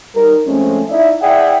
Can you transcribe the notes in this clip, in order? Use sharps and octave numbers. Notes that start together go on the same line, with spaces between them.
G3 D#4 A#4
F3 G#3 A3 C4 C#4
D#4 E4 D5 E5
E4 G#4 D5 E5 F#5 G5